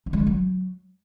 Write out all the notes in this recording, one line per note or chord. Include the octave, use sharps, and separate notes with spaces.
D#4
G#3
F4
F#3